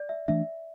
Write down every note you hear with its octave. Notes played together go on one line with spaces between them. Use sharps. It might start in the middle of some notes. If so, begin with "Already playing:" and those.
Already playing: D5
E5
E3 A3 D4 E5